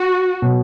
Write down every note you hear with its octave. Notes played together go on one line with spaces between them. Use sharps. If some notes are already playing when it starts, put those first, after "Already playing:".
Already playing: F#4
B2 F#3